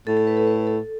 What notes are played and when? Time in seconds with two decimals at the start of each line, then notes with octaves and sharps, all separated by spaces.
0.07 A2 A4
0.17 A4
0.27 B4
0.37 A4
0.47 B4
0.67 A4